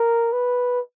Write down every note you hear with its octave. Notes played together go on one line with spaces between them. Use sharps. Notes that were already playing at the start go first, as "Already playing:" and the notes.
Already playing: A#4
B4